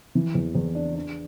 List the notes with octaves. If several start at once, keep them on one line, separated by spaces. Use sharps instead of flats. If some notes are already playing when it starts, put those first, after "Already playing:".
E3
E2
E2
D4
D4